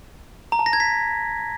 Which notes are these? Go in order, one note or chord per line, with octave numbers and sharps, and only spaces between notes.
A#5
A5
A#6
G#6
B6